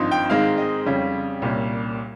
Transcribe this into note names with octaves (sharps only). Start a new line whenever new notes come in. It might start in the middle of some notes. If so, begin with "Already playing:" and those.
Already playing: G#1 G2 F3 C4 D#4
G5
G#2 D#3 G#3 C4 F5
D#5
F2 C#3 G3 C#4 F4
C2 A#2 G3 C#4